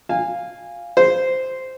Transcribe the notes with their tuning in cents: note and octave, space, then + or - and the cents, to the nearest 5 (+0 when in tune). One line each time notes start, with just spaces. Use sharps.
F5 +0 G#5 -20
G#4 -10 C5 -10